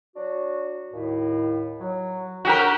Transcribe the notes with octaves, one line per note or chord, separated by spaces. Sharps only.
F#3 D4 F#4
D#2 A2
F#3
C#3 C#4 D4 F#4 G4 A#4